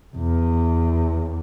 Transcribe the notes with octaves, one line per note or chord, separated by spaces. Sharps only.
E2